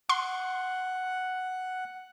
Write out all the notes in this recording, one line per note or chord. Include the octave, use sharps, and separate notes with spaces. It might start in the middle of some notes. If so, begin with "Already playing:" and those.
F#5 C6